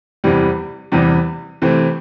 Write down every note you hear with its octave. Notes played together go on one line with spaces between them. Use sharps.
E2 C3 E3 G3
E2 C3 E3 G3
C3 E3 A3 C4